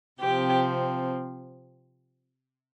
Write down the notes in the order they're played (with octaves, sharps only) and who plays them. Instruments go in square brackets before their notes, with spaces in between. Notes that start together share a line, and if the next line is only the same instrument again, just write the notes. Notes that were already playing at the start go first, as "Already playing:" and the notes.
[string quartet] C3 F3 C4 G4